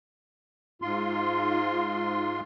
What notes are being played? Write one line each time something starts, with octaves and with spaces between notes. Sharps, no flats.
G#2 F4 C6